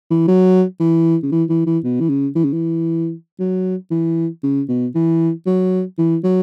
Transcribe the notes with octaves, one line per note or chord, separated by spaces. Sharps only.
E3
F#3
E3
C#3
E3
E3
E3
B2
E3
C#3
E3
C#3
E3
F#3
E3
C#3
B2
E3
F#3
E3
F#3